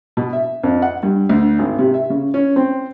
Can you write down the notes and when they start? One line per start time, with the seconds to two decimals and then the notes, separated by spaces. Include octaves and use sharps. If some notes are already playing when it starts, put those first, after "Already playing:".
0.17 B2
0.33 E5
0.63 F2
0.82 F#5
1.03 G2
1.29 D2
1.59 G#1
1.79 C3
1.94 E5
2.10 C#3
2.34 C#4
2.56 C4